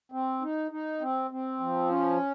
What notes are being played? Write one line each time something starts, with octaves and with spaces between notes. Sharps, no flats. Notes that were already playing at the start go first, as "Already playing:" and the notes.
C4
D#4
D#4
C4
C4
F3
C#4